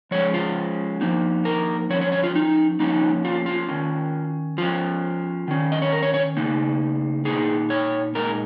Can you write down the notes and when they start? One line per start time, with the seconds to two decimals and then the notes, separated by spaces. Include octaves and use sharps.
0.11 F3 G#3 C#4 C#5
0.34 F4
1.01 F3 A#3 D#4
1.45 A#4
1.90 F3 C#5
1.93 C#4
2.01 C#5
2.12 C#5
2.23 F4
2.35 D#4
2.79 F3 A#3 C#4 D#4
3.25 F4
3.46 F4
3.68 D#3 C#4
4.58 F3 C#4 F4
5.48 D#3 C#4
5.72 D#5
5.82 C#5
5.92 A#4
6.02 C#5
6.14 C#5
6.37 C#3 A#3 D#4
7.25 A#2 A#3 D#4 G#4
7.70 C#5
8.15 A#2 G#3 D#4 A#4